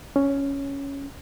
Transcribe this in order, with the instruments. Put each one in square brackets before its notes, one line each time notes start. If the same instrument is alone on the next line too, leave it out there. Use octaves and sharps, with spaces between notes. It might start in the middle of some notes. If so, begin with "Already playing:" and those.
[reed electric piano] C#4